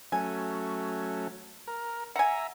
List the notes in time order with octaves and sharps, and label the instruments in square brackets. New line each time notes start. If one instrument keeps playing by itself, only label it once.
[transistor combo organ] F#3 A3 C#4 [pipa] G#5
[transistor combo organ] A#4
[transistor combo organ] E5 A#5 [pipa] F#5 G#5